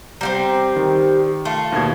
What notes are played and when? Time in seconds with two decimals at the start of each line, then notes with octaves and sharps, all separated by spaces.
0.21 G3 B3 C4 A#5 G6
0.76 D#3
1.45 A3 F4
1.72 D#2 B2 G#6